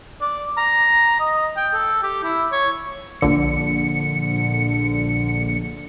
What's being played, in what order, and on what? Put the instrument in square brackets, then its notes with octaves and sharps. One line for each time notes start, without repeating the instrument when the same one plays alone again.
[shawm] D5
A#5
D#5
G5
A4
G4
E4
C#5
[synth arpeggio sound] A#1 D3 C#7